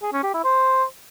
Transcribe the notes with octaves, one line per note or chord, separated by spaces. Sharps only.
G#4
C#4
G4
E4
C5